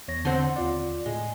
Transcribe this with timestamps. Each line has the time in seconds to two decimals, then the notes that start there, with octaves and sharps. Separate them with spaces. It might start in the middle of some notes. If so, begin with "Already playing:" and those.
0.08 E2 C#5 A#6
0.25 D3 C4 F#5 C6
0.56 D#2 F4 D5
1.06 A2 G#3